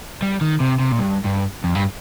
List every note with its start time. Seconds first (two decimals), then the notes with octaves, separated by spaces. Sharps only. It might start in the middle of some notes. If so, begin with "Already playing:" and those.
0.22 G3
0.41 D#3
0.60 C3
0.79 C3
0.92 A#2
0.99 G2
1.24 G2
1.64 F2
1.75 G2